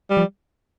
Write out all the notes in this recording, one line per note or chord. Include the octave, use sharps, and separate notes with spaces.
G3
F3